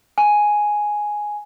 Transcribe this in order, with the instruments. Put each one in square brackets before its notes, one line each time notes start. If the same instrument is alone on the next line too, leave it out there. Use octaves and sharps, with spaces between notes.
[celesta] G#5